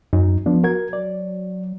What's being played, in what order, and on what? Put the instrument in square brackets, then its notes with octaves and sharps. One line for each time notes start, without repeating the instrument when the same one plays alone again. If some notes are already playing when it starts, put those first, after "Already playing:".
[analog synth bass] F#2 [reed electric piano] D#4
[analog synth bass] D3 [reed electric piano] F3 B3 F4
[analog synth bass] F#3 [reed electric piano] A#4 G#6
[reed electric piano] D5